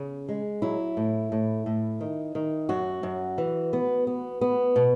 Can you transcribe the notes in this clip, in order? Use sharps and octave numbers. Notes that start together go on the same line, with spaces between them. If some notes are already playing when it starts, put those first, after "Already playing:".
Already playing: C#3
G#3
F#3 E4
A2
A2
A2
D#3
D#3
F#2 F#4
F#2
E3
B3
B3
B3
B2